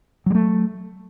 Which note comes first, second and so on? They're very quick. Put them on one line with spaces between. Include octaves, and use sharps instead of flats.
F#3 G3 A3